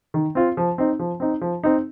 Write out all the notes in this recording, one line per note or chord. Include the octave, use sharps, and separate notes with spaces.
D#3
C4 F4
F3
C4 D#4
F3
C4 D#4
F3
C4 D#4